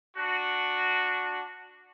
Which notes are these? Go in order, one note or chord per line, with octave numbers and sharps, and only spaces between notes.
D4 F#4